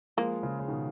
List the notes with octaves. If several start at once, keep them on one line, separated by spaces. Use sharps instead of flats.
F3 G#3 A#3
C#3 F3
C#3
B2 D#3